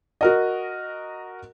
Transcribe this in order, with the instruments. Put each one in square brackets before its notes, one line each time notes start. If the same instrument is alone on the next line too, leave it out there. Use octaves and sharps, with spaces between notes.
[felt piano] F#4 A#4 D#5